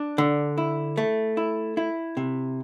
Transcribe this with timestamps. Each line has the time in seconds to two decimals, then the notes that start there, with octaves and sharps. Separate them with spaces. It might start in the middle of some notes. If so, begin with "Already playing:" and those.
Already playing: D4
0.18 D3
0.58 E4
0.97 A3
1.37 E4
1.77 E4
2.17 C3